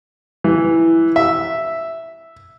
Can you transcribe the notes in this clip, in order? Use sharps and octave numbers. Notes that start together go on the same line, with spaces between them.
E3
E5